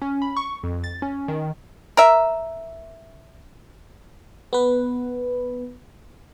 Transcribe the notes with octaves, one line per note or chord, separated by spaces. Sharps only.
C#4
B5
C#6
F2
A6
C#4
D#3
A#4 E5
B3 B4